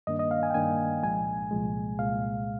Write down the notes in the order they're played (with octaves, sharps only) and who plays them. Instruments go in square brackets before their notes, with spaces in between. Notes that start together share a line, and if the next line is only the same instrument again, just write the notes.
[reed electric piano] G2 D#3 A#3 D4 D#5
D#5
F5
G#5
G5
G2 D#3 A#3 D4 G#5
C2 A#2 F3 G#3 G#5
C2 A#2 F3 G#3
C2 A#2 G#3 F5